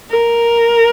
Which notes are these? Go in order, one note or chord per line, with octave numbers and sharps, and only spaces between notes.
A#4